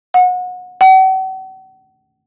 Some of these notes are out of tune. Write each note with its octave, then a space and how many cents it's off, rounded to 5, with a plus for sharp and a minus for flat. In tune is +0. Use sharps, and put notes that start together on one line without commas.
F#5 -30
F#5 +45